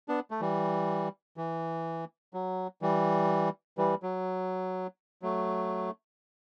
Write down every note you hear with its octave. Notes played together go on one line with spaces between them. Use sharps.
B3 D4
A3
E3 G3
E3
F#3
E3 G3
E3 G3
F#3
F#3 A3